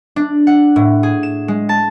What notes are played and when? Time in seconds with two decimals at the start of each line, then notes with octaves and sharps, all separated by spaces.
0.16 D4
0.47 F#5
0.76 A2
1.03 G#4
1.23 E7
1.48 G#3
1.69 A5